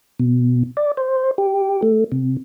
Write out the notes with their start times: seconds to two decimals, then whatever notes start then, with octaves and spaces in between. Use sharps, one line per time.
0.19 B2
0.77 D5
0.97 C5
1.38 G4
1.82 A3
2.12 C3